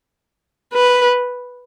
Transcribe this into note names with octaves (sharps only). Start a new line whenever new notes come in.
B4